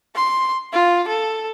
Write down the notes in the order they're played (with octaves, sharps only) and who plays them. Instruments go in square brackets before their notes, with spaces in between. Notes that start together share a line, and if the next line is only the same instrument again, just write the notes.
[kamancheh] C6
F4
A4